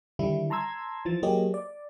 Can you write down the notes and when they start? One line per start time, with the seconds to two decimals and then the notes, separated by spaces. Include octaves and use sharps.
0.19 D3 D#3 G3 E4
0.50 A5 A#5 C6 E6 G#6
1.05 E3 F3 A6
1.23 F#3 A#3 G4 G#4 C#5 D#5
1.54 D5